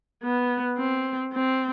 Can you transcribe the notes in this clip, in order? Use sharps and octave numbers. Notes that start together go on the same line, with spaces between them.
B3
C4
C4